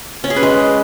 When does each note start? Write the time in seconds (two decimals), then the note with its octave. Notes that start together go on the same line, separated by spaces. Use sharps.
0.24 C#4
0.30 G#4
0.36 B4
0.43 G#3